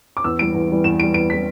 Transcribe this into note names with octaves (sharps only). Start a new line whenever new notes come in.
D6
E2 E6
E3 G3 D7
E2
E3 G3
E2 E7
E3 G3 D7
E2 D7
E3 G3 B6